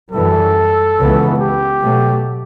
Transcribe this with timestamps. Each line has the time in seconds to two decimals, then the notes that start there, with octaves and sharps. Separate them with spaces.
0.12 F#2 E3 G3 A4
0.98 C#2 C#3 E3 B3
1.40 G4
1.83 B2 F#3 A3